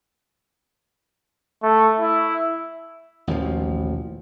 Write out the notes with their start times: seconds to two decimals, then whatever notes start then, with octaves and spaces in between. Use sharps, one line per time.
1.63 A3
2.00 E4
3.27 A1 D#2 B2 F3